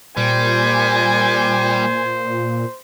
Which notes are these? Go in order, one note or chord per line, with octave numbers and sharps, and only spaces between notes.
A#2 G3 C5 G#5